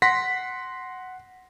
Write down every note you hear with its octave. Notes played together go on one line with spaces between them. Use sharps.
F#5 C6 A#6 B6